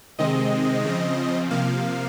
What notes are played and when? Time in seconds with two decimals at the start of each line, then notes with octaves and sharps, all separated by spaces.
0.19 C3 D#3 G#3 C4 D#5
0.85 C#3 F3 C4
1.51 C3 F3 A#3 F5